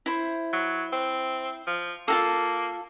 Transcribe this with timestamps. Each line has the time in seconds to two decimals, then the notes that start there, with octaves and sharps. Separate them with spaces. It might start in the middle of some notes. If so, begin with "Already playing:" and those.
0.06 E4 C5
0.53 F#3
0.93 C4
1.67 F3
2.08 A#3 F4 F#4 A4